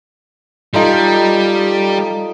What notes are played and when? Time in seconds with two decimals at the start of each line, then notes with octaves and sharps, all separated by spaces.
0.74 G3 D#4 F4 A4